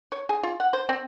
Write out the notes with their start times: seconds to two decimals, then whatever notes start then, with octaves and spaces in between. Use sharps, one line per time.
0.12 C#5
0.29 G#4
0.43 F4
0.60 F#5
0.73 C5
0.89 C4